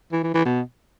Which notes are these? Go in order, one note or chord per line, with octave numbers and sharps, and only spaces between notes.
E3
E3
E3
B2